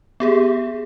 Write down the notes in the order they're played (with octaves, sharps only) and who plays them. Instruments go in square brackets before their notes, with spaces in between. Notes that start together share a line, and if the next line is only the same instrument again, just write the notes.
[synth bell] B3 G4 G#4